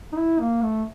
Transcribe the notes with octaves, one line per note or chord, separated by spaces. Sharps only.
D#4
E4
A#3
A3